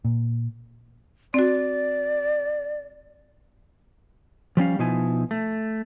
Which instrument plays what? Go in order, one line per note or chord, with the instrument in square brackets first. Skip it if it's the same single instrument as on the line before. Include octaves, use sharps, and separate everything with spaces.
[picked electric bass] A#2
[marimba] C4 F#4 [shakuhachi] D5
[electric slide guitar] F3 G3 C#4 F5
B2 F3 D#4 E4 G#5
A3